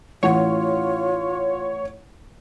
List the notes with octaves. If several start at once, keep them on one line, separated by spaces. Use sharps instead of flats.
A1 F4 C#5 F#5